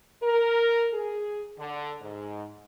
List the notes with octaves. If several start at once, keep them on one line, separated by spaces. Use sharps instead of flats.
A#4
G#4
D3
G#2